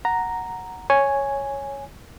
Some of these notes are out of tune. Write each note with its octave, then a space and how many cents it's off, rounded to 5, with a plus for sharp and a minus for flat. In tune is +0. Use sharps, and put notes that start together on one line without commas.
F#5 +0 A#5 +0
C#5 +0 G#5 +0